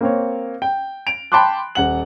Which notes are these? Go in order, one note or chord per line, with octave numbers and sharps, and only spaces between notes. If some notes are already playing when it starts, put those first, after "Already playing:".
A#3 C4 C#5
G5
D7 F7
G5 A5 B5 C6 D6 F#6
D#1 F#5 F#7